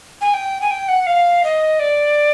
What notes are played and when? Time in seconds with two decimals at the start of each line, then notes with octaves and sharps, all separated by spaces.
0.21 G#5
0.34 G5
0.61 G#5
0.70 G5
0.88 F#5
1.06 F5
1.44 D#5
1.79 D5